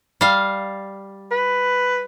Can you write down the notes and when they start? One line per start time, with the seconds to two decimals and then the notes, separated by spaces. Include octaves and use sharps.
0.21 G3 F5
1.32 B4